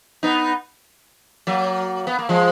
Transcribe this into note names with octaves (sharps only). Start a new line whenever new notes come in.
B3 D#4
F#3 A#3
B3
A#3
F3 G#3